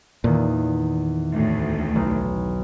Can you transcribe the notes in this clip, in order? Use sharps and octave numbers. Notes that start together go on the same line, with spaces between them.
E2 A#2 D#3
D2 A2
B1